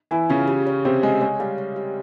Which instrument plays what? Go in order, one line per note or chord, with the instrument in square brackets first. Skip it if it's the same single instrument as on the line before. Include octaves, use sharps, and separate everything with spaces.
[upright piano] E3 E4 [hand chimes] G#5
[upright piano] C#3 C#4 [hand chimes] F4
[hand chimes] G4
C#5
[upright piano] C3 C4 [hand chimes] G4
[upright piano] G#3 [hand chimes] G#5
[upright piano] G#3 [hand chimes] C#5
[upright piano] G3 [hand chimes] F5
[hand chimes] C#5
G4